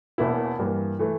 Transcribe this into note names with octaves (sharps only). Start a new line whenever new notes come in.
E1 E2 E3 A#3 E4
G2 E3 A#3
E3 A3